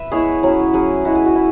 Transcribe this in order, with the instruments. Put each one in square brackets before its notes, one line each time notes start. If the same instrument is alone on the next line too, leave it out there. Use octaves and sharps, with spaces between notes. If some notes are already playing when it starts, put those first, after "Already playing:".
Already playing: [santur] B4 E5
G#3 B3 E4 G#4 C#5
F#3 C#4 E4
F#3 C#4 E4 G#4
G#3 E4 F#4
G#4
F#4
E4